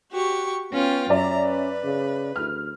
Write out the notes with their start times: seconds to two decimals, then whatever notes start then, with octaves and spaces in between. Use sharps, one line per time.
0.11 F#4 G4 C#6
0.72 B3 C#4 F4 G5
1.10 F#2 C#4 D5 E5 A#5
1.44 B4
1.84 C#3
2.36 D2 F6